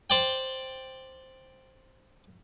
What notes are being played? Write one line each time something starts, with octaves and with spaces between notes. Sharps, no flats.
C5 D5 G5